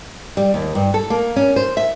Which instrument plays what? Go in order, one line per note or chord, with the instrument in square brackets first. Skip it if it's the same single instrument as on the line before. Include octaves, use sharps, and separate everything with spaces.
[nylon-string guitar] G3
D#2
G2
A4
A#3
C#4
C5
E5